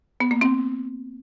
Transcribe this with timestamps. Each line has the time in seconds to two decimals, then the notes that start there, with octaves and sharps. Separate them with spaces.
0.20 B3
0.31 A#3
0.41 C4